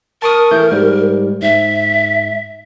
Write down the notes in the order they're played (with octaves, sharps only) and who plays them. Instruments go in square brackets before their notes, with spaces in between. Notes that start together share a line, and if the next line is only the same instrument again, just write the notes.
[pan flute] A#4 [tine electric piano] A5 C#6 D#6
[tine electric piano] E3 A3 G6
G#2 G3
[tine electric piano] G#2 [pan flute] E5